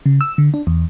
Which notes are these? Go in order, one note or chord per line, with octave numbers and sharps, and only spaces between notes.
C#3
E6
D3
D4
E2